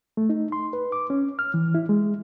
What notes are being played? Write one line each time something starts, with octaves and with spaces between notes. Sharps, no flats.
A3
D#4
C6
B4
D6
C#4
F6
E3
E4
G#3